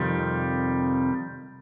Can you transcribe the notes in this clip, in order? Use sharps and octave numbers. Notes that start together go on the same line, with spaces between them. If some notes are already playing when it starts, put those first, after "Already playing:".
Already playing: F2 C3 D#3 G3